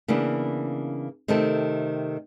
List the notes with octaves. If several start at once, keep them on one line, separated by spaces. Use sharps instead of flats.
C#3 E3 A#3 B3 D4
C3 D#3 A3 C4 A4